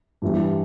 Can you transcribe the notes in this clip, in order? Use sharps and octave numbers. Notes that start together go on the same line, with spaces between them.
G2 E3 G3